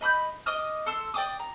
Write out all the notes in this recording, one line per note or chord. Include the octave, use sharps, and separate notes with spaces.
D#5 B5 D#6 G6
D#5 D6 D#6 F6
A4 C6 E6
D5 G5 D6 D#6
A#5